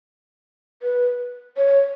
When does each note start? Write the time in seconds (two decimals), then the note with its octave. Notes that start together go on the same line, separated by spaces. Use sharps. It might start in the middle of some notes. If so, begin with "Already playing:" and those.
0.82 B4
1.57 C#5